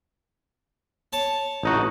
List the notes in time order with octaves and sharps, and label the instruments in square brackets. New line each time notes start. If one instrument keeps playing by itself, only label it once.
[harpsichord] C#5 A5
[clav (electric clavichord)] A1 D#4 F#4